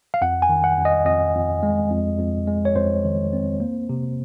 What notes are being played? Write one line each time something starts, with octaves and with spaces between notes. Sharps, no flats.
F5
F2 F#5
G#5
D#3
F#5
F2
D#5
F2 D#5
F2
G#3
F2
F2
G#3
C#5
F2 C5
D#3
C4
A#3
C3